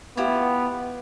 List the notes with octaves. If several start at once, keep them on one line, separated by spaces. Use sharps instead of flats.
B3 E4 F4 G4